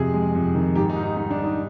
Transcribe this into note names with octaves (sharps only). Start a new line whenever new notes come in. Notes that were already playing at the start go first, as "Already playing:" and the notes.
Already playing: F2 C3 G#4
G#3
F2
D#3
G#2 G4
D#4
G#2
D#4
G3 D#4
D4
G3
D#4